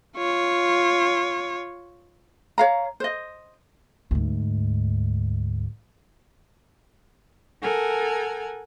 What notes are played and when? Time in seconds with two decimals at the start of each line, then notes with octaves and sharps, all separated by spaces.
0.17 F4 C#5
2.58 C#5 F5 A#5
3.00 C5 D#5
4.11 D2 G#2
7.62 A4 A#4 F#5 G#5